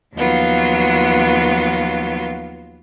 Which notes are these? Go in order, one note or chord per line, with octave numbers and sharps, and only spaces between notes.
D#2 F3 F#3 B3 F4